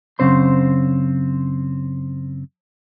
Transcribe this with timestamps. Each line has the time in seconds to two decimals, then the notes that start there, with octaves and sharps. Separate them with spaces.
0.19 F#2 C#3 C4 C5 C6